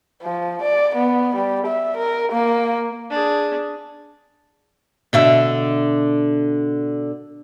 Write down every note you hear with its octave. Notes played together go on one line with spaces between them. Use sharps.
F3
D5
B3
G3
E5
A#4
A#3
D4 G#4
B2 D3 E5